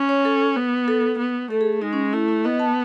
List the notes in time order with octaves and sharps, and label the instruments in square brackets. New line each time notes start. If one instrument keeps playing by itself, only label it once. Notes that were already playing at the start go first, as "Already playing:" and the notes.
Already playing: [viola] C#4
[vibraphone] C#5
A4
[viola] B3
[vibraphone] A4
[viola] B3
[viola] A3 [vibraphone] A4
[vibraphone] G#4
[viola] G#3 [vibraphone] D#4
[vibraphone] C#4
[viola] A3 [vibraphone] E4
[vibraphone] E4
[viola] B3 [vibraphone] D#5
[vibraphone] A5